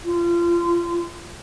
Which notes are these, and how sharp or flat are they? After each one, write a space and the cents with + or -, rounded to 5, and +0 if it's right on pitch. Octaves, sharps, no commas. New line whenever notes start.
F4 -30